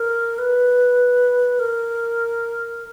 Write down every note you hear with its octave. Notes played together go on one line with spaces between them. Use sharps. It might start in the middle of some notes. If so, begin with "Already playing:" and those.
Already playing: A#4
B4
A#4